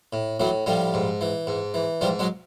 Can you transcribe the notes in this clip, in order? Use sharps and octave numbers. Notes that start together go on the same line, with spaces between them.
A2
A2 E3 F#3
A2 F3 G3
G#2
E3
G#2
E3
G#2 F3 G3
F#3 G#3